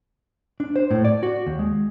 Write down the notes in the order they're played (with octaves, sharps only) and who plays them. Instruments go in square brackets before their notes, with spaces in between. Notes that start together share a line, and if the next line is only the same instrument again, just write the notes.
[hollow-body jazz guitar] D4
C5
A2
D5
F#4
D#2
G#3